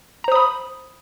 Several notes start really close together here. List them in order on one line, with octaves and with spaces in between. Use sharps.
A#5 C5 D#6 B5